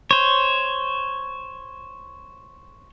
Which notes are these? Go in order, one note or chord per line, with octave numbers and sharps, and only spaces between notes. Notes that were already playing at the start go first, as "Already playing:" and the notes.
C5 C#5